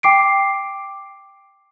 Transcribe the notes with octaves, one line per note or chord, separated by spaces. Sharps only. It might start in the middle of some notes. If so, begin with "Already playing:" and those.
G5 D6 C7 D7